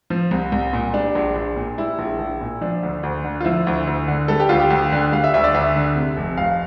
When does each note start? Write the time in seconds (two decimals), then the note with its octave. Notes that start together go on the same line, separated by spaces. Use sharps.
0.10 F3
0.31 C2
0.52 C2
0.73 A#2
0.94 G3 D4
1.15 A#1
1.36 A#1
1.56 A#2
1.78 G3 E4
1.99 A#1
2.19 A#1
2.41 A#2
2.61 F3 D4
2.83 D2
3.03 D2
3.25 D3
3.40 F4
3.45 F3 E4
3.67 D2
3.87 D2
4.08 D3
4.28 G3 A4
4.40 G4
4.49 D2 F4
4.60 G4
4.70 D2
4.92 D3
5.12 G3 F5
5.24 E5
5.34 D2 E5
5.44 D5
5.54 D2 E5
5.76 D3
5.96 C3
6.17 F1
6.37 F1 F5